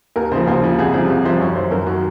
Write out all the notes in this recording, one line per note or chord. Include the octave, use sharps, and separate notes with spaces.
D#2 A#4
C#3 F3 C5
D#2 C5
C#3 F3
C2 G#4
C3 F3 G#4
C2
C3 F3 C5
F#2 C#5
D#3 C5
F#2 A#4
D#3 F#4